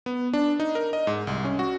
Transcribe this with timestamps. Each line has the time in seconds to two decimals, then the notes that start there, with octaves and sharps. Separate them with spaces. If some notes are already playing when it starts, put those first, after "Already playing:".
0.06 B3
0.33 D4
0.60 D#4
0.75 A#4
0.93 D#5
1.07 G#2
1.27 C2
1.45 C#4
1.59 F#4